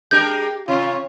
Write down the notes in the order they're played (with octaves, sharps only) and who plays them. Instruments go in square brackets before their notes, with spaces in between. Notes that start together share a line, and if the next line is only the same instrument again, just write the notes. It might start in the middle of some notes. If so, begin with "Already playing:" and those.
[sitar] G#3 D4 A#4 [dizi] G4 [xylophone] G6
[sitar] C3 [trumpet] F4 [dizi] C#5